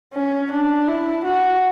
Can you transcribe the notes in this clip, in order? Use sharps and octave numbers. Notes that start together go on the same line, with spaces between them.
C#4
D4
E4
F#4